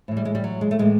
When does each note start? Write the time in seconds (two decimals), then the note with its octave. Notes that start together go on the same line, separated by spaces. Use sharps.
0.08 A2 E3
0.17 G3
0.25 G#3
0.35 G3
0.44 F#3
0.61 G#3
0.71 A3
0.79 A2 E3 G#3